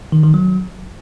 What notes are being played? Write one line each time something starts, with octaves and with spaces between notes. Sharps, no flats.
D#3
D#3
F#3